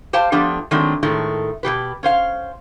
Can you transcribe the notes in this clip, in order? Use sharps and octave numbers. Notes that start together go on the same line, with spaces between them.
G4 C5 F5 G5 A5
F3 A3 B3 D4 G4
D#3 F#3 G#3 A3 C4 D4
A2 D#3 G#3 A3
B2 D#3 G4 B4
C#4 C5 F5